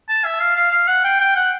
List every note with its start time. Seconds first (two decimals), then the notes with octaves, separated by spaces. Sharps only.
0.09 A5
0.25 E5
0.40 F5
0.56 F5
0.72 F5
0.88 F#5
1.04 G5
1.20 G5
1.36 F#5